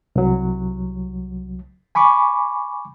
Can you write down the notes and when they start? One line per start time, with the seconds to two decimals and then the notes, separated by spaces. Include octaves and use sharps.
0.16 C2 F#3
1.95 G#5 B5 C#6 D6